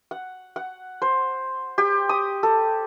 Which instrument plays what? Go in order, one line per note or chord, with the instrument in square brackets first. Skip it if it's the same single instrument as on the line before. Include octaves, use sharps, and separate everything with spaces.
[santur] F#5
F#5
C5
G4
D#6
A4